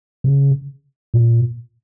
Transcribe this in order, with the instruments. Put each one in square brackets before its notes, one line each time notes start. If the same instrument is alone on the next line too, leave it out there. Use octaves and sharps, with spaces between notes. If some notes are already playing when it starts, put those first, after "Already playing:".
[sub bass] C#3
A#2